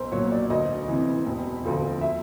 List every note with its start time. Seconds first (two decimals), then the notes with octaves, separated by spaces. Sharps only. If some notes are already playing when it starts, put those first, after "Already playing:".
Already playing: B1 A#4 C5
0.12 A#2 F#3 C#5
0.32 D5
0.50 D2 D#5
0.88 C3 E3
1.26 E1
1.64 D2 D3 F3
2.01 E5